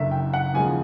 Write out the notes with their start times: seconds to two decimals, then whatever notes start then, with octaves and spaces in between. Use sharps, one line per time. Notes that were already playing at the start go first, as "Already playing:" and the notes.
Already playing: F#1 F#2 D3 E5
0.11 G5
0.34 F#5
0.54 D#2 C#3 F3 G#3 G#5